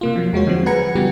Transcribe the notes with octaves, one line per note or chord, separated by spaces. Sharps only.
C3 A#3 F4
F3 F#3
E2 G#3 F#4 C#5
D3 F3 F#3 C4
G#4 B4 F#5 A#5 G#6 C#7
C#3 E3 G3 B3 F#4 G4